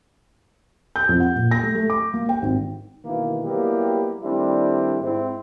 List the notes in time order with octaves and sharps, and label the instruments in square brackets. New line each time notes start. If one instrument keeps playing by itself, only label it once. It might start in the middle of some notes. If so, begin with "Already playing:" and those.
[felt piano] G6
F2
F#5
A#2
A#6
A3
A3
D6
A#3
G5
G#1
[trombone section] G2 B2 D#3 E3 A#3
F#3 G3 A#3 B3 E4 G4
D#3 G3 A3 C4 D4 E4
G#2 C4 E4